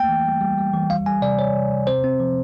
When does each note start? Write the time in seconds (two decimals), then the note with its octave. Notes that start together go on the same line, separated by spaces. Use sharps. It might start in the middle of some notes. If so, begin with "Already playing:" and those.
Already playing: A3 A#3 G5
0.09 E3
0.25 G3
0.41 G3
0.58 G3
0.73 E3
0.90 G3 F5
1.06 G3 G#5
1.22 C3 D5
1.39 G3 C#5
1.56 C3
1.71 C3
1.87 C4 C5
2.04 C4
2.20 F3